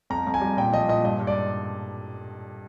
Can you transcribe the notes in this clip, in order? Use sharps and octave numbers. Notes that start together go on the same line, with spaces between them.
F2 A#5
F2
G#5
G3
A#2 G5
F3 D#5
A#2 D#5
G2 D#5
G2
D5